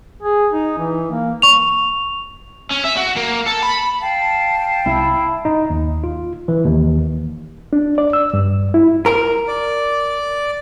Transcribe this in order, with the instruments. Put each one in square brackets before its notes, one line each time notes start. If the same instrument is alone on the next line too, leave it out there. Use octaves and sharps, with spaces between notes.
[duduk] G#4
D#4
E3
A#3
[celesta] C#6 F7
[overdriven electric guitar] C#4
E5
F#4
A#3
A4
B5
[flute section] F5 G5 A5
[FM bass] C2 [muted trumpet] E4
[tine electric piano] D#4
D#2
F4
E3
D#2
[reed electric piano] D4
D5
E6
G2
E4
[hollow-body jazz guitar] A#4
[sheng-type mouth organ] D5